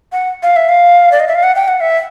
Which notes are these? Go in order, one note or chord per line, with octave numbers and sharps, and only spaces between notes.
F#5
F5
E5
F5
D5
D#5
E5
F5
F#5
G5
F#5
E5